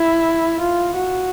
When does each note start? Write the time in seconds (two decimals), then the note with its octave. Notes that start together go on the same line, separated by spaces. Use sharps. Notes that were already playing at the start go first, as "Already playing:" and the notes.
Already playing: E4
0.60 F4
0.95 F#4